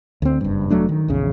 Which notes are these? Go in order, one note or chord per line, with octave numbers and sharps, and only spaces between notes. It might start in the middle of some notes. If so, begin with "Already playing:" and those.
D2 C4
F#1 G2
F1 F#3 A3 D4
D#3
A#1 E2 C#3